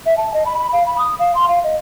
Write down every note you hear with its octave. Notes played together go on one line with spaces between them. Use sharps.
E5
A5
D#5
B5
B5
F5
B5
D#6
F5
C6
F5
D#5